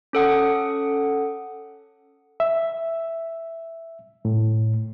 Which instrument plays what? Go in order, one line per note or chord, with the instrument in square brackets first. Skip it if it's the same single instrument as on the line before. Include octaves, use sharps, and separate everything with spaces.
[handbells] C#4 A4 F#5 D#6
[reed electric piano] E5
A2